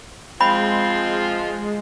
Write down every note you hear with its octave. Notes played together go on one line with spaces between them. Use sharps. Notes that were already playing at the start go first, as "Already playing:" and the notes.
F3 G#3 C4 F4 B5